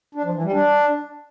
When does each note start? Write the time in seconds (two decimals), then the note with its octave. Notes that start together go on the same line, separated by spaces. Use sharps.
0.15 D4
0.24 F3
0.34 E3
0.43 G3
0.52 D4